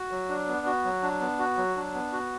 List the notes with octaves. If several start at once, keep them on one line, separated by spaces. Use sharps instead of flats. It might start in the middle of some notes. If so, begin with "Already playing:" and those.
Already playing: F#4
F#3
D4
B3
F#4
F#3
D4
B3
F#4
F#3
D4
B3
F#4